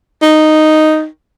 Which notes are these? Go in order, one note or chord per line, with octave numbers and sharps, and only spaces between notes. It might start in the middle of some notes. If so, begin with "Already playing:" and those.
D#4